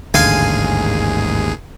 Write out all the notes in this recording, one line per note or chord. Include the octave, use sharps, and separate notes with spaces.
A1 D#2 G#2 D3 G#4 F5 G#5